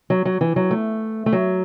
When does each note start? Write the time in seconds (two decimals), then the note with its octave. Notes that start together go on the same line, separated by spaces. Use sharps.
0.10 F#3
0.25 F#3
0.41 E3
0.56 F#3
0.71 A3
1.26 A3
1.33 F#3